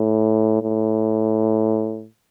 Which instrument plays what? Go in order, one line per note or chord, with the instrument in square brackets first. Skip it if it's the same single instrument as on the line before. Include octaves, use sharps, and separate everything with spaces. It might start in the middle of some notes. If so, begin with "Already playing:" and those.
Already playing: [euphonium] A2
A2